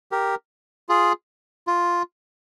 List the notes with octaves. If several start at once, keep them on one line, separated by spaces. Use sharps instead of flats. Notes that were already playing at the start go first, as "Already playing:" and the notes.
G4 A#4
F4 G#4
F4